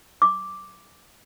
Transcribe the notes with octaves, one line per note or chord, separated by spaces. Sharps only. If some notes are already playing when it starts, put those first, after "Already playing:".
D6